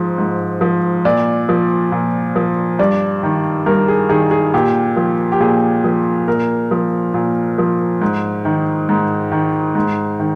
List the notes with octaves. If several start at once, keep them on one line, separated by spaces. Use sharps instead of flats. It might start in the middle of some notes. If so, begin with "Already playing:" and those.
Already playing: G#2 F3
G#2
F3
A#2 D5
F3
A#2
F3
G2 D5
D#3
G2 A#4
G#4
D#3 G#4
G#4
A#2 G4
F3
G4
A#2 G#4
F3
A#2 A#4
F3
A#2
F3
G#2
D#3
G#2
D#3
G#2
D#3